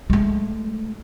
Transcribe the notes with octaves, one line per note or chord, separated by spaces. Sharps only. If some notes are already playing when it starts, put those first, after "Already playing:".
G#3 A3